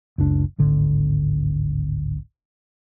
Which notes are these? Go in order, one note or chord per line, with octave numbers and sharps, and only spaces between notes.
F#1 C#2 D4
D1 G#1 D3